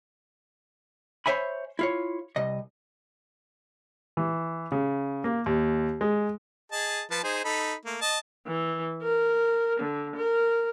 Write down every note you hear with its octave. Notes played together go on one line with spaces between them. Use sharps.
C5 C#5 E5 G#5 B5
E4 F4 C#5
C2 C3 D#5
E3
C#3
A#3
D#2
G#3
G#4 D#5 A5
F3 B4 A5
D#4 G#4 C5
D#4 A4 B5
A3 A#3
D#5 A5
E3
A#4
D3
A#4